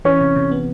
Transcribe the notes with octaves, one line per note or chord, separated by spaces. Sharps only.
E3 C#4
C3
C3
B3